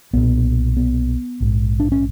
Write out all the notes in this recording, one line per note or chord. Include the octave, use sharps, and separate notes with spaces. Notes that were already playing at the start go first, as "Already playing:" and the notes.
B1 A#2 B3
B3
A#1 G#2
D4
C#4